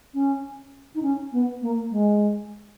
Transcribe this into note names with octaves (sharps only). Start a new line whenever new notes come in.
C#4
D#4
C#4
B3
A#3
G#3